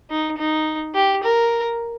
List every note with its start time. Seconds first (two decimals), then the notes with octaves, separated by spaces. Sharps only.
0.10 D#4
0.38 D#4
0.95 G4
1.23 A#4